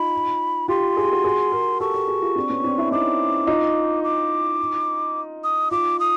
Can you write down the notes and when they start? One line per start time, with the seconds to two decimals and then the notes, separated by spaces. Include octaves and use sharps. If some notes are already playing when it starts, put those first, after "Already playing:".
Already playing: D#4 F4 B5
0.68 F4 G4 C6
0.97 G#4
1.04 G4
1.12 F#4 G#4
1.24 F#4 G#4
1.52 G#4 A#4
1.80 G4 A4 C#6
1.94 G4 A4
2.08 F#4 G#4
2.22 F4 G4
2.36 C4 D4
2.50 B3 C#4
2.64 C4 D4
2.78 D4 E4
2.92 C#4 D#4 D6
3.47 D#4 F4
4.04 D6
5.44 D#6
5.71 D#4 F4 D6
5.99 D#6